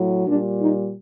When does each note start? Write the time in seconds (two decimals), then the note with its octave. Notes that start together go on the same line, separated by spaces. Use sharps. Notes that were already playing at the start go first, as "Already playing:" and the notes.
Already playing: A2 F#3
0.27 A#2 G3 D4
0.60 D#4